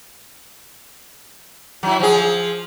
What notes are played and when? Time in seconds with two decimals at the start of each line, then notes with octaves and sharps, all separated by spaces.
1.83 F#3 E4
2.00 F3 G#4